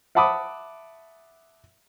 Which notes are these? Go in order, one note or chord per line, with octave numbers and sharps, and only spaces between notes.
E5 F#5 A5 B5 D6 D#6